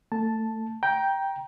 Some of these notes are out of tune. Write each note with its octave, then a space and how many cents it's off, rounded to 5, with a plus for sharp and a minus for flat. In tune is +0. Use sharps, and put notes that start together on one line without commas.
A3 +20 A5 +0
G5 +0 A#5 +20